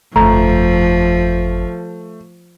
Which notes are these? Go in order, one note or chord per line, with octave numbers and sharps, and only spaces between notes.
G1 F2 F3 A3 A#5